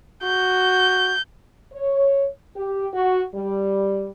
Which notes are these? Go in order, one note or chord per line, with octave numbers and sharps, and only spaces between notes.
F#4 G6
C#5
G4
F#4
G3